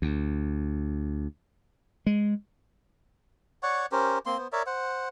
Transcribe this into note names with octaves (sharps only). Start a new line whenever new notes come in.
D2
G#3
C#5 D5 F#5 C#6
C#4 G4 A#4 C5
A#3 C4 C6
B3 C5
A#4 C#5 D5 E5
C5 F#5